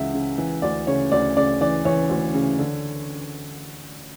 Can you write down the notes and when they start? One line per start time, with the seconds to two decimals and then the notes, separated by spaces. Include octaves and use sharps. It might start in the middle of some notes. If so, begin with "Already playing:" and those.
Already playing: C#2 C#3 E3 E5 F#5
0.14 C#3
0.38 E3
0.62 D2 D5
0.87 C#3 C#5
1.12 D2 D5
1.37 C#3 D5
1.61 E3 D5
1.85 E3 C#5
2.10 D2
2.34 C#3
2.59 D3